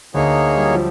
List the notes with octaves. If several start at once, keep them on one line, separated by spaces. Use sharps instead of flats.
D2 D3 A#3 D#4 G#4 C#5
G3
F#3
F3